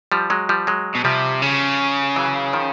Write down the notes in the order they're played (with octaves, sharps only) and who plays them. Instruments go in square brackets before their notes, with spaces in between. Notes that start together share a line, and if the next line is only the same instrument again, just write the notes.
[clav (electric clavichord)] F3 G3
F#3 G#3
F3 G3
F#3 G#3
[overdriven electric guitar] B2
[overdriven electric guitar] C3 [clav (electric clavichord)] F3 G3
[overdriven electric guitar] C#3
[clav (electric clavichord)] E3 F#3
D#3 F3